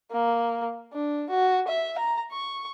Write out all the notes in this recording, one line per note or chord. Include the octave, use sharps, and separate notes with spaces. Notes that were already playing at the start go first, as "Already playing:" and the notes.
A#3
D4
F#4
E5
A#5
C#6